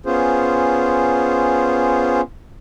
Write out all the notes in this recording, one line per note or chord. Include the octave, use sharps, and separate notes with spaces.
B3 C#4 F4 G#4 C5